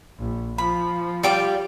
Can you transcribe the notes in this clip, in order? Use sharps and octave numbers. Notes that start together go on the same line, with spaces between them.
A#1
F3 B5
G3 F4 G5 D6